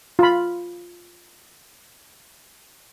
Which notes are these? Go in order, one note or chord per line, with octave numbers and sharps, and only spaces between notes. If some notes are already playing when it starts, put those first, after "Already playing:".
F4 B5